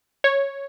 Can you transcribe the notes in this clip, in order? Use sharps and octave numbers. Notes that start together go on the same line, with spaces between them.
C#5